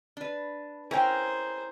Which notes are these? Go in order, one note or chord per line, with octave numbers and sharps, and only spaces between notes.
D4 B4
C#4 E4 G#4 A#4 C5 G5